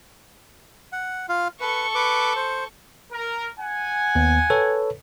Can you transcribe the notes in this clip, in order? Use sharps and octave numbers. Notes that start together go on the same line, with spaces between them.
F#5
F4 F5
A4 B4 C#6
B4 D6
C5
A#4
F#5 G#5
D#2 B3
A4 B4 C#5